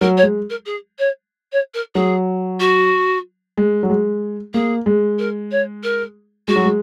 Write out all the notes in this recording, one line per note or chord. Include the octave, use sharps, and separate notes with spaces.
F#3 A#4
C#5
G#3
A#4
G#4
C#5
C#5
A#4
F#3 G#4
F#4
G#3
F#3
G#3
A#3 G#4
G#3
A#4
C#5
A#4
G#3 F#4
F#3
G#3